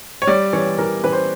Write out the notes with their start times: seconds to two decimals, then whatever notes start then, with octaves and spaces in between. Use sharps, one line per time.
0.22 C#5
0.27 G3 D5
0.53 E3 C#5
0.78 E3 A#4
1.04 E3 B4
1.12 C5